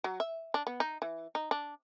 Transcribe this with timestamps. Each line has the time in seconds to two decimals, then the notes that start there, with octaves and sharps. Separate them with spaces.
0.04 F#3
0.20 E5
0.54 D4
0.67 B3
0.80 D#4
1.02 E3
1.35 D#4
1.51 D4